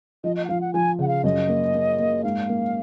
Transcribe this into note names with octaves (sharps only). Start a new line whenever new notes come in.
F3 D#5
D#5
F#5
F3 F5
F#5
F3 G#5
C#3 F#5
F5
F#2 D#5
A#3
A#3
A#3
G#2 F5
A#3